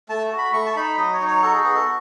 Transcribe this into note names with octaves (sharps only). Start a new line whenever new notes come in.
A3 A5
F#4
B5
A3 C#6
A5
D#4 B5
F#3 D#5
C#5
D#4
C#5
F#4 A4
G#4
B3 G#4
A4